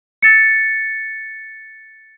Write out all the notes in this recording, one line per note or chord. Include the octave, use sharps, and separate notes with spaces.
A6 C#7